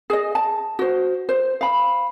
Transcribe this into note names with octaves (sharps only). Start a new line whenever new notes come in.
G#4 D#5
A5
F#4 C5
C5
F5 B5